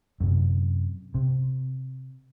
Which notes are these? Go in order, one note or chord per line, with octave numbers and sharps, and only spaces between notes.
F#2 C3
C3